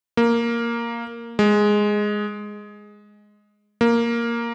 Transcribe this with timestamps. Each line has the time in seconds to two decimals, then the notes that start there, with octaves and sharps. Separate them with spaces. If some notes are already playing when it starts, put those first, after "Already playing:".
0.17 A#3
1.39 G#3
3.81 A#3